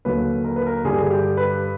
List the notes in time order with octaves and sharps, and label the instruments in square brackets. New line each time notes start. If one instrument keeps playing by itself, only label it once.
[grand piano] D#2 D3 F#3 B4
A#4
B4
A#4
G2 D3 G3 G#4
G#4
G4
B4